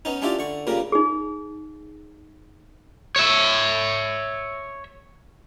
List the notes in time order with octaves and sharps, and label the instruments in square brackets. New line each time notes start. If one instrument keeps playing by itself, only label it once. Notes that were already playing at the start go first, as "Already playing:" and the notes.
[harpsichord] B3 C#4 D#4
C#4 D4 E4 F4 G4 D5
D3 C#6
A#2 C#3 G3 A#4
[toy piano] D#4 G#4
[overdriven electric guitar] C#5 E5